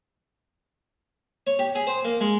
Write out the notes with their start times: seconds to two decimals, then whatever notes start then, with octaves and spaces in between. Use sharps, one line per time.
1.47 C#5
1.59 G4
1.75 G#4
1.87 C5
2.05 A#3
2.21 G#3